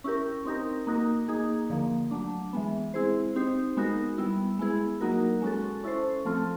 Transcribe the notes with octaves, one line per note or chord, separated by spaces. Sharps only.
C#4 E4 G4 A#4
C4 D#4 G4 A#4
A#3 D#4 F#4 A#4
A#3 D#4 G#4
D3 F3 A#3
F#3 A3 D4
E3 G#3 B3
G#3 C4 E4 G#4 C5
C4 D#4 G4 C5
G#3 B3 D#4 F#4 A#4
G3 B3 E4
G#3 B3 E4 G#4
F#3 A#3 D#4 F#4 A#4
G#3 C#4 F#4 A4
C#4 E4 A4 C5
F3 A3 C4 F4 A4